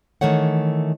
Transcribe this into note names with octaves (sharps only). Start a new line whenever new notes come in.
D#3 E3 A3 C#5 F#5